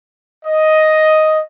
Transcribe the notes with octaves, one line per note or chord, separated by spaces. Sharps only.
D#5